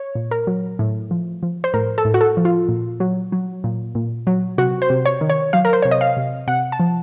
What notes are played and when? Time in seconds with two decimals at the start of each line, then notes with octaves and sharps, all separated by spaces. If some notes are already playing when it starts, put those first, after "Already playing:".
Already playing: C#5
0.15 A#2
0.31 A#4
0.47 F#3
0.79 A2
1.11 F3
1.43 F3
1.64 C5
1.74 A2 A#4
1.98 A4
2.05 A2
2.14 F#4
2.21 A4
2.37 F3
2.45 F4
2.69 A#2
3.00 F#3
3.32 F#3
3.64 A#2
3.95 A#2
4.27 F#3
4.58 C3 F#4
4.82 C5
4.90 C3
5.06 C#5
5.21 D#3
5.30 C#5
5.53 F#3 F5
5.65 A#4
5.73 C5
5.82 C3 C#5
5.91 D#5
6.01 F5
6.17 C3
6.47 C3 F#5
6.72 A5
6.80 F3